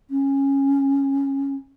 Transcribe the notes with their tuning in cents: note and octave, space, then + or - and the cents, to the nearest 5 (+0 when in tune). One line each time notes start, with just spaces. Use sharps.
C#4 -10